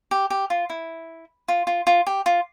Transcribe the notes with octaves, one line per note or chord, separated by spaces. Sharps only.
G4
G4
F4
E4
F4
F4
F4
G4
F4